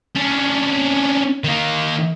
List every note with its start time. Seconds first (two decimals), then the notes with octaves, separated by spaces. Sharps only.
0.15 C#4 D4
1.44 D#3 A#3